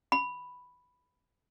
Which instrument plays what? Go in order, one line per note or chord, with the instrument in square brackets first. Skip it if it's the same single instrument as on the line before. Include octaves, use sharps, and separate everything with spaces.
[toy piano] B5